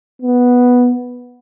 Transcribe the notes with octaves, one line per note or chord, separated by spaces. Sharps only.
B3